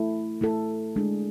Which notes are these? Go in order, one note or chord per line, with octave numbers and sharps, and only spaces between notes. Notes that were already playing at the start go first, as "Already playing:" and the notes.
Already playing: A3 E4 A4
A3 E4 A4
G#3 D4 G#4